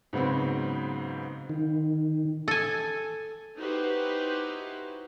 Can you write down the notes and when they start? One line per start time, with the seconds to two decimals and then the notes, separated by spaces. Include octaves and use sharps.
0.13 G#2 C#3 F#3 B3 C4
1.49 D#3
2.48 A4 G#5
3.58 D#4 E4 F#4 G4 B4 C5